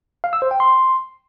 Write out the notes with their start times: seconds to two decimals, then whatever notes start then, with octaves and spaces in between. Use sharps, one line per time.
0.24 F5
0.33 E6
0.42 C5
0.51 G5
0.60 C6